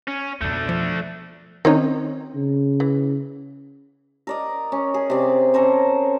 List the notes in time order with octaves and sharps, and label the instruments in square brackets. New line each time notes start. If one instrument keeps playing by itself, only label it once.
[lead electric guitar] C#4
[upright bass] F2 B2 [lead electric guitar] A3 D4
[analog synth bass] F3
[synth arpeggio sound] D#3 D#4 [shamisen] C4 C#4 C#5
[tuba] C#3
[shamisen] E3
[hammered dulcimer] A#4 D5 D#5
C#4
G#4
C3 D5
C#4 A4 A#4 C5